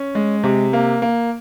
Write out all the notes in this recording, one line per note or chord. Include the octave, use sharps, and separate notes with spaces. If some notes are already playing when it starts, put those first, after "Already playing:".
Already playing: C#4
G#3
C3
A#3
A#3